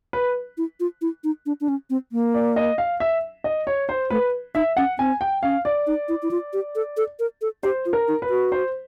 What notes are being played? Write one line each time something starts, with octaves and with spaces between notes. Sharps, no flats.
B4
E4
F4
E4
D#4
D4
D4
C#4
C4
A#3
D5
D#5
F5
E5
D#5
C#5
C5
A3 B4
D#4 E5
C#4 F#5
C4 G#5
G5
C#4 F5
D5
D#4
E4
E4
F4
G4
A4
A4
A#4
A4
G4 C5
F4
A#4
D#4
B4
F#4
C5